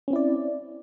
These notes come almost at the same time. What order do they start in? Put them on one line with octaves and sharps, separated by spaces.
C#4 C4 E4 D5